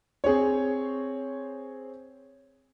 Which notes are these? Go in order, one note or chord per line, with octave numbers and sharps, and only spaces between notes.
C4 G#4 C5 C#5